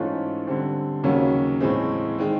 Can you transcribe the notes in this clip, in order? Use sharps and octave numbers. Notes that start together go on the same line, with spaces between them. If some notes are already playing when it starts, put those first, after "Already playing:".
Already playing: G#2 E3 A3 C#4 F4
D3 G3 C4
D#2 C#3 F#3 A#3 C#4
A2 E3 G#3 C4
D#3 G#3